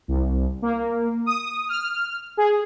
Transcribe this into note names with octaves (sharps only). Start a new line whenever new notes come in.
C2
A#3
D#6
F6
G#4